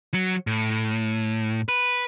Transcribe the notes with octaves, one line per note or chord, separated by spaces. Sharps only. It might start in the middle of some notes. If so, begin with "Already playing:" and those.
F#3
A2
B4